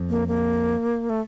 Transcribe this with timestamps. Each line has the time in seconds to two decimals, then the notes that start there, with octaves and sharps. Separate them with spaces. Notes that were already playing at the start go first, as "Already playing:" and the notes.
Already playing: F2
0.09 A#3
0.28 A#3
1.10 A3